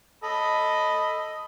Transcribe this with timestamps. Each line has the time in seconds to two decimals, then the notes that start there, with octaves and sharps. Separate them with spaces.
0.24 A4 D#5 B5